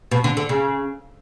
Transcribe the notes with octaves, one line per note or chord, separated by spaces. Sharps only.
B2
D3
D3
C#3